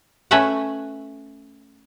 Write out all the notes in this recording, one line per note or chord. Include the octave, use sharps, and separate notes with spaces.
A3 C#4 B4 E5 F#5